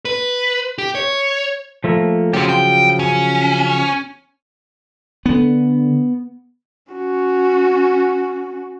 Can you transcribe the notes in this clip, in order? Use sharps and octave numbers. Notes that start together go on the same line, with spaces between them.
B4
G4
C#5
F3 A3 A#3
C#3 F3 F#3 C4 G4
G5
C#4
D3 B3
C#4 F#4